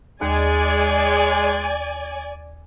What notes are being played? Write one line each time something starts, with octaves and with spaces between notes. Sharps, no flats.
D#2 G#3 D5 G#5